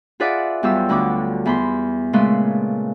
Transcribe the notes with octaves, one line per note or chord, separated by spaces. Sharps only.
F4 G#4 B4 D5 E5 F#5
E2 F#3 G3 F4 E6
D2 D3 B5 D6
E2 B5 C6
A#2 C#3 G#3 A3 B4 C6